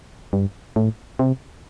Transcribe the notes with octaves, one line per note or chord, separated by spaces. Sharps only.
G2
A2
C3